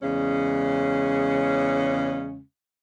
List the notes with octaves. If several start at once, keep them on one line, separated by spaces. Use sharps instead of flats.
E2 C#3 G#3 C#4